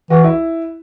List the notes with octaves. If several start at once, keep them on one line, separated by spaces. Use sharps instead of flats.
E3 F#4
E4